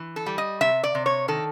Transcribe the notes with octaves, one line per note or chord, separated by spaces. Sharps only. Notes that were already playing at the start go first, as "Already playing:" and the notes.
Already playing: E3
A4
G3
D#5
C3 E5
D5
C3
C#5
D#3 A4